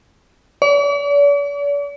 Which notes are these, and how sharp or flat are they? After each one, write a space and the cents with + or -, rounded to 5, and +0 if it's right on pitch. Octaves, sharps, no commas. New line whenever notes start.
D5 -45